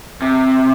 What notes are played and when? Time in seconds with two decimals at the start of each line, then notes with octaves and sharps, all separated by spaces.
0.22 C3